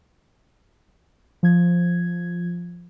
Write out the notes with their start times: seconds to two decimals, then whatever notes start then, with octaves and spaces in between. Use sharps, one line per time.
1.43 F3 G#6